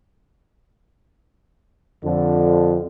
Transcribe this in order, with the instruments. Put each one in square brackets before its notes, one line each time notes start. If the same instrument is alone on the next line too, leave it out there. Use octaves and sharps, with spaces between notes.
[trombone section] F2 D3